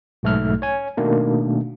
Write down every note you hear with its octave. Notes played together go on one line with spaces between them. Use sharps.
B1 G#2 A3 A4 F6
C#5 G#5
B2 D#3 A3 A#3 D4